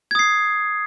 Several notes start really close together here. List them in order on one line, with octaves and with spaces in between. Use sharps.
G#6 D#6 C7